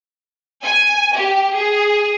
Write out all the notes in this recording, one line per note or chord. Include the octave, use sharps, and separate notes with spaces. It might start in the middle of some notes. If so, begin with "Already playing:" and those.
G#5
G4
G#4